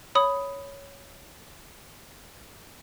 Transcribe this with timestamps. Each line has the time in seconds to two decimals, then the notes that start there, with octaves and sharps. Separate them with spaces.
0.15 C#5 B5 D#6